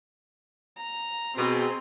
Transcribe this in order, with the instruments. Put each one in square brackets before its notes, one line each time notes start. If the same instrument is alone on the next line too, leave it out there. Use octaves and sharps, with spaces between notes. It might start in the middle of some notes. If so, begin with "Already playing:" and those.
[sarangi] A#5
[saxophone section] B2 [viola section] C4 G#4